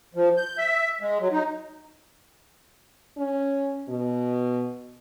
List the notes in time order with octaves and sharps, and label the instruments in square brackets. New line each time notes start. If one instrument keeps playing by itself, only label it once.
[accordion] F3
G6
E5
G#3
F#3
D#4
[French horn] C#4
B2